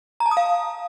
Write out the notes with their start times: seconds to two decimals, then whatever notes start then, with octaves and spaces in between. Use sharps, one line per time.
0.20 A#5
0.26 A5
0.31 D#6
0.37 F5